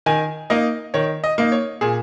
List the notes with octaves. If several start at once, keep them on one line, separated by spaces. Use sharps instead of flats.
D#3 G#5
A#3 D#4 D#5
D#3 C#5
D#5
A#3 D#4
C#5
A#2 G#4